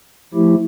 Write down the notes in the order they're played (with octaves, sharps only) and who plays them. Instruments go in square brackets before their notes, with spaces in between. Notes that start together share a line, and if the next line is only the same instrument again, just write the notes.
[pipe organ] F3 A3 E4 G4